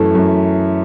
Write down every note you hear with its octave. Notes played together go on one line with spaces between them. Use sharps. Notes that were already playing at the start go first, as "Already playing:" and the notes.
Already playing: F#2 E3 A3 E4 A4
F#2